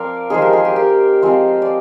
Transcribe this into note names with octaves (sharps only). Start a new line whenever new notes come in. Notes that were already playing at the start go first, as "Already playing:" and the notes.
Already playing: F3 C4 F4 A#4 D5 F5
F3 G#3 D#4 G#4 C5
G4 A#4
F4 G#4
G4
G4 A#4
F3 G#3 C4 F4
D5